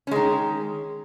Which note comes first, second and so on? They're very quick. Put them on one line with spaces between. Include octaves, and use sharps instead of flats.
C#4 G#3 D#3